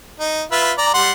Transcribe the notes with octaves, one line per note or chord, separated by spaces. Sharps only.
D#4
F4 B4 E5
D5 A#5
G3 F#5 C6